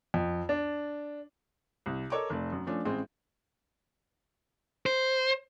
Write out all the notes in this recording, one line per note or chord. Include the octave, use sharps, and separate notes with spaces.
F2
D4
C2
A4 A#4 C#5 D#5 D6
F1 A3 D5
F#2
F3 A3 C#4 D4
A1 G#3 C4
C5